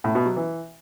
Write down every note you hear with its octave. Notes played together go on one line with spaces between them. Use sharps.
A2
B2
F#3
E3